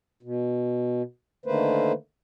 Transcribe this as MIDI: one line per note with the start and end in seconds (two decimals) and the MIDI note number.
0.23 1.02 47
1.46 1.92 50
1.46 1.92 51
1.46 1.92 57
1.46 1.92 58
1.46 1.92 71
1.46 1.92 72